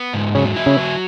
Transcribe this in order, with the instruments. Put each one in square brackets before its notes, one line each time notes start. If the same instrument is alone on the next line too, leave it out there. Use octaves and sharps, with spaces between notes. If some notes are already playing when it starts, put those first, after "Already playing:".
Already playing: [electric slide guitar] B3
G#2
[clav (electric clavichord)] C#3 C#4 [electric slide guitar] F#3
[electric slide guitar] E4
[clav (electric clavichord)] C#3 C#4
[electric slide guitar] F#3